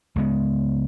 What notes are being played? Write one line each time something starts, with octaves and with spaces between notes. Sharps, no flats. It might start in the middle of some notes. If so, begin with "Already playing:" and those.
C#2 G#3 B3